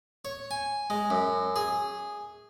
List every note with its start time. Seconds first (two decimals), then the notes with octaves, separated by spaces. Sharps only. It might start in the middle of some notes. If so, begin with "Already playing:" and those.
0.25 C#5
0.51 G#5
0.90 G#3
1.10 F#2
1.56 G#4